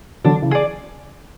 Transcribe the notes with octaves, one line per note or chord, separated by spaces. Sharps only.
D3 F#3 D4
C#3 E3
G#4 D5